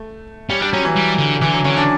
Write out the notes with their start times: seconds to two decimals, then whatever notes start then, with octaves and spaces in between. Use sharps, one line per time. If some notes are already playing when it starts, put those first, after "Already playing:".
Already playing: A3
0.50 G3 C#4
0.61 G3 D4
0.73 F#3 C#4
0.85 E3
0.97 G3
1.19 D3
1.42 D3 E3
1.54 F#3
1.65 D3 C#4
1.77 D4